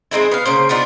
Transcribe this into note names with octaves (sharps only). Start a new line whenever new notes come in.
G#3 C4 D#4 E4
B3 F5
C#3 A#3 C5
B3 D4 D#4 F4